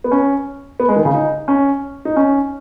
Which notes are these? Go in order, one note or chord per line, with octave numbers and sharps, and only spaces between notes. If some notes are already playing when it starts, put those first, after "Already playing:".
B3
C#4
B3
G#3
D#3
C#3
D#4
C#4
D#4
C#4